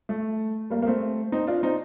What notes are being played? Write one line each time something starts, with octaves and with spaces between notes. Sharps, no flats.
A3
G3 A#3
A#3
A3 C4
C4 D#4
D4 F4
C4 D#4